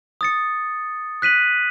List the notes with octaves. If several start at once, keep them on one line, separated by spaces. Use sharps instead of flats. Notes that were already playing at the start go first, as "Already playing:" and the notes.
D#6 A6 C#7
F#6 B6 D#7 F#7